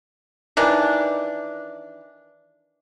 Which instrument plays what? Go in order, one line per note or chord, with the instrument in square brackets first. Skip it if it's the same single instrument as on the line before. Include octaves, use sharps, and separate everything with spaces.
[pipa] D#3 E3 D4